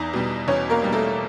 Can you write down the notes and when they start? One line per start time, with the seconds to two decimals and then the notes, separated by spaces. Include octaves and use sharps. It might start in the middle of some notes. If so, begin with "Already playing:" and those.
Already playing: E2 D#4 D#5
0.13 B2 G3
0.48 E2 C#4 C#5
0.70 A#3 A#4
0.82 B2 G3
0.93 A3 A4